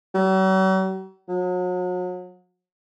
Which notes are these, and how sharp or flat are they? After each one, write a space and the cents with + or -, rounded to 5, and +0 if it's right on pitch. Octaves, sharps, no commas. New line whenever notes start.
F#3 +45
F#3 -35